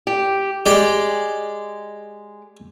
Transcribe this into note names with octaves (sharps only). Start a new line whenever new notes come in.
G4
G#3 G4 D5 G5